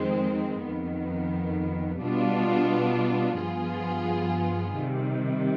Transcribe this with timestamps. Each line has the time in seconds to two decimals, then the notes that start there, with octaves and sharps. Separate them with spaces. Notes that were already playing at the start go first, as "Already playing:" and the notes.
Already playing: F2 D#3 G#3 C4
0.64 F2 D#3 B3
2.02 B2 G3 B3 D4 F4
3.40 G2 F3 B3 F4 G#4
4.79 C3 D#3 G3